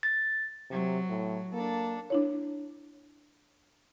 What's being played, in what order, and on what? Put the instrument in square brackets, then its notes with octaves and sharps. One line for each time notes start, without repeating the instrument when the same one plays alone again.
[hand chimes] A6
[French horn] C3 [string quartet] F#3
[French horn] A2
[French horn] A#3 [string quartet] D4 A4
[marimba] D4 E4 C#5